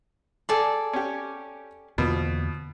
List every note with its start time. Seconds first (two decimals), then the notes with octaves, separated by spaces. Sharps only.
0.49 G#4 A4 D5
0.93 C#4 G4
1.98 E2 B2 D3 F3 A#3